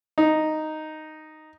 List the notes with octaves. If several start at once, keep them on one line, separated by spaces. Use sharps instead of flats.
D#4